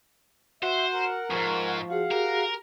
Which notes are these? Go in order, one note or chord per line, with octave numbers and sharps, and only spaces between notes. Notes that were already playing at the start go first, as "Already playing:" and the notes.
F#4 C5 E5
A#4 F#5
E2 G#2 F3 C#6
F#4 G#4 F5 F#5
G4 A#4